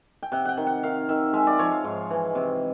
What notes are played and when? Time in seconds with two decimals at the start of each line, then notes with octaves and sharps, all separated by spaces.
0.23 G5
0.32 C3 F#5
0.45 F#5 G5
0.57 D#3
0.67 F#5
0.83 D#3 F5
1.09 D#3 E5
1.33 G#3 E5
1.47 D5
1.59 F3 C#5
1.72 F5
1.84 G#2
2.10 E3
2.35 C3